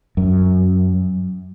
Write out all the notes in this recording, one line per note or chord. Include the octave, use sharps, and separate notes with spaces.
F#2